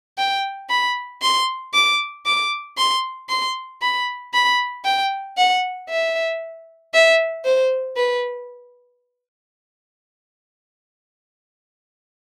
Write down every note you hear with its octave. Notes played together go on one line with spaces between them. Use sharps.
G5
B5
C6
D6
D6
C6
C6
B5
B5
G5
F#5
E5
E5
C5
B4